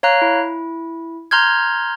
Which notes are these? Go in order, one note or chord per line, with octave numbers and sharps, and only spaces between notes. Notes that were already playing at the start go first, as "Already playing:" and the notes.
C#5 F5 A#5 F#6
E4
A#5 C6 F6 G6 G#6